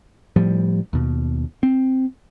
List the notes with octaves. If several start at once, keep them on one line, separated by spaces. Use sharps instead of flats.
A2 F3 G3
D#2 B2
C4